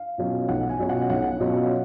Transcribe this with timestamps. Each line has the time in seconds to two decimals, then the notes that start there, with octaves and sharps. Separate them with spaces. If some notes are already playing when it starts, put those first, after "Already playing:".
Already playing: F5
0.18 B2 F#3 C#4 F4
0.49 B1 F#5
0.69 G#5
0.79 B2 F#3 C#4 F4
0.89 F#5
1.10 B1 F#5
1.40 B2 F#3 C#4 F4